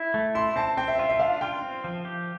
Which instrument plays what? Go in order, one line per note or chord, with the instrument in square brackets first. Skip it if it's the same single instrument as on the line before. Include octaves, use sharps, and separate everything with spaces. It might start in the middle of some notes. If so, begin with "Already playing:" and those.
Already playing: [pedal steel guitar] E4
A3
[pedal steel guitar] E4 [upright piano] C6
[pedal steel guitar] C4 [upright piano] A5
[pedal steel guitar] C4 [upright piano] G5
[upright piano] E5
[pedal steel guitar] F4 [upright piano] E5
[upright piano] E5
[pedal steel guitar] D4 [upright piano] F5
[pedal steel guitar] F4 [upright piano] G5
[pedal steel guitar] C4
F3
G4